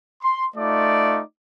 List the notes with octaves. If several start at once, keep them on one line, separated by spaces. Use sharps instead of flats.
C6
A3 D#4 F4 D5 D6